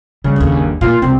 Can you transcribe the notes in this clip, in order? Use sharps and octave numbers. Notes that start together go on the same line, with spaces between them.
C#3 G3
G1 D#2
A#2 F4
C2 C4